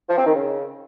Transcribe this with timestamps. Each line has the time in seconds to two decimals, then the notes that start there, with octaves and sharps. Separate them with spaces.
0.09 F3
0.18 C4
0.26 D#3
0.34 C#3